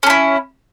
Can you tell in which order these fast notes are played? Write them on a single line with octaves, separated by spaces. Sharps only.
C#4 D4 E4